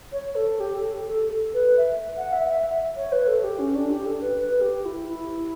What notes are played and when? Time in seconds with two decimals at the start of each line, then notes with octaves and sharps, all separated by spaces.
0.12 C#5
0.35 A4
0.60 G4
0.75 A4
1.07 A4
1.54 B4
1.77 E5
2.17 F#5
2.33 E5
2.48 E5
2.96 C#5
3.12 B4
3.27 A4
3.44 G4
3.59 C#4
3.75 D4
3.90 G4
4.06 A4
4.22 B4
4.37 B4
4.61 G4
4.85 E4
5.09 E4